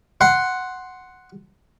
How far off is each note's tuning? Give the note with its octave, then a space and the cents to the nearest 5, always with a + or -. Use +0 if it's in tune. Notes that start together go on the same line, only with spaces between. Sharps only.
F#5 +0 C6 +0